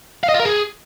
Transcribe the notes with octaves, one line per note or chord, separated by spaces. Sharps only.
F5
D#5
F4
A#4
G#4